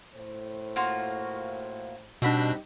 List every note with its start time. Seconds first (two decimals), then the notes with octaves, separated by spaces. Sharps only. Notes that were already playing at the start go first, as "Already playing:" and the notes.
0.14 A2 C5
0.76 A#3 F4 F#4
2.22 B2 G3 C4 D4 D#4 F#5 B5